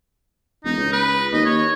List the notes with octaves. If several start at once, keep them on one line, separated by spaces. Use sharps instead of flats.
E1 D#4
C#2
B4
D#2 D#5
C#5